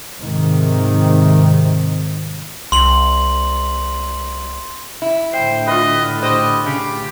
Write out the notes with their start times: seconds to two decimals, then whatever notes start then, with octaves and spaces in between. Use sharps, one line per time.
0.21 G#2 C3 D#3
2.72 C2 C6 F#7
5.02 E4
5.33 A2 D3 C5 G5
5.67 F4 B4 D#5
6.23 G4 C5 D#5
6.66 C#3 G4